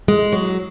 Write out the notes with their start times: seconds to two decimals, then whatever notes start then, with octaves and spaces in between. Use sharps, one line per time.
0.08 G#3
0.32 F#3